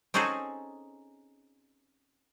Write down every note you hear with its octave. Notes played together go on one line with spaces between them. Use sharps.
C4 C#4 D#4 F#4 G#4 A4